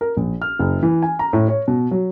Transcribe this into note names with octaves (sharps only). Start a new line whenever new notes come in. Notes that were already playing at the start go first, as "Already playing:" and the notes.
A#4
A#1
F6
F#1
E3
G#5
A#5
A2
C#5
B2
F#3